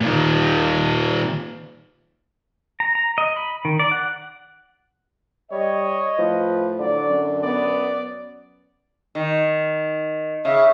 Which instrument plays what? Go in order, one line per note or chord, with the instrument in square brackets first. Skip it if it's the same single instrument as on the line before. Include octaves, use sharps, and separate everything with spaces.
[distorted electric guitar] A#2 D#3
[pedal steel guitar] A#5
A#5
D#5
B5
D#3
D5
F#5
[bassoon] G3 [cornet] C#5 [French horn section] D#5
[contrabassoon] A2 [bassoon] F3 [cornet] B4
[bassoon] D3 [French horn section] F#3 [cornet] D5
[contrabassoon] F#2
[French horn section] B3 [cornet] D5
[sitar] D#3
[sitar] C#3 [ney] E5